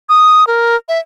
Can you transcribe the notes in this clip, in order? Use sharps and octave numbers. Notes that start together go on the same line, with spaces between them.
D#6
A#4
E5